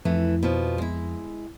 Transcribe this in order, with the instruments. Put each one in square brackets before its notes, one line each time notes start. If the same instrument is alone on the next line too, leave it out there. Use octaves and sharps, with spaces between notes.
[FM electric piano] F2 [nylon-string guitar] E3 A3
[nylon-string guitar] B2 F3
G#3 E4